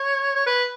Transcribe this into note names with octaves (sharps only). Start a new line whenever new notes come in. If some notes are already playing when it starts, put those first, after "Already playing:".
Already playing: C#5
C#5
B4